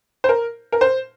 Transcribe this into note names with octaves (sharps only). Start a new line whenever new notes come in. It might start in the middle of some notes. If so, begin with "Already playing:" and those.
C5
A#4
A#4
C5